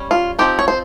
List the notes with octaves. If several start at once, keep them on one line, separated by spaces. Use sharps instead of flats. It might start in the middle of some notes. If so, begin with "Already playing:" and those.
Already playing: G3 C#4
F4
F3 C4 D#4 G4
C#5
C5